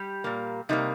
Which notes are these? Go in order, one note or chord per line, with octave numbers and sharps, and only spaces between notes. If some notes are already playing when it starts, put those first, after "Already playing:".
Already playing: G3 G4
A#2 A#3
C3 G3 A#3 D#4